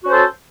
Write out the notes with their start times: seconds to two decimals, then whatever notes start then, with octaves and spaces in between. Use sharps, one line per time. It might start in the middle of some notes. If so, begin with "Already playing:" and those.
0.03 F#4
0.06 C#4
0.09 C5
0.12 A4